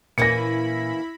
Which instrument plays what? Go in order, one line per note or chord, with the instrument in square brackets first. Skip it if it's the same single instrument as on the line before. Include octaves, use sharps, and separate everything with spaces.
[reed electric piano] A#2 [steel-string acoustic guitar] E3 A#3 C#4 [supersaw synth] E4 B5 [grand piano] A#6 C#7